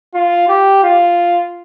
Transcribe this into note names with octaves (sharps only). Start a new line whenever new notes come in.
F4
G4
F4